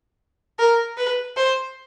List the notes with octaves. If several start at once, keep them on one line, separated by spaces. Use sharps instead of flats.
A#4
B4
C5